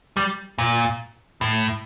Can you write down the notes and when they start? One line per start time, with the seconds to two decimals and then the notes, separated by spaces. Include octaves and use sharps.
0.17 G3
0.58 A#2
1.41 A2